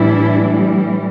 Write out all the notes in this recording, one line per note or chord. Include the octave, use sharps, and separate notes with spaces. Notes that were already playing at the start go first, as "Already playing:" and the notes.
Already playing: A2 E3 G3 D4 E4